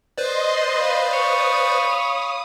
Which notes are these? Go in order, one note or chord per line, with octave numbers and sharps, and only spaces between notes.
B4 C5 D5 D#5 C6
F5 B5
C#5 D#6